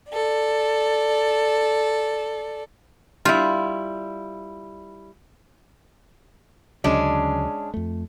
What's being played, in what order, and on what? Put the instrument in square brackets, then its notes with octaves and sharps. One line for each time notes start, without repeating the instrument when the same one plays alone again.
[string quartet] A4 D5
[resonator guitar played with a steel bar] G3 E4 [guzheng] F4
[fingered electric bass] D2 C#3 F#3 [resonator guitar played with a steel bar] G#3 C#4 D4
[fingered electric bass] F2 A3